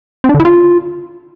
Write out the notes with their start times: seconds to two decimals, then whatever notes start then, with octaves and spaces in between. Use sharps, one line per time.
0.24 C4
0.29 D4
0.34 D3
0.40 E4
0.45 F4